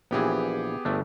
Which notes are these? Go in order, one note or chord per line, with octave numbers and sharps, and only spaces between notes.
A#1 E3 B3 G4 G#4
G1 A3 D4